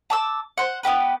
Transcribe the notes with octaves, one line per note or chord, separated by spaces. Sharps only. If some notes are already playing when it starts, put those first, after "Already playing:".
A5 D6 E6
C5 F#5
B3 D4 G4 B4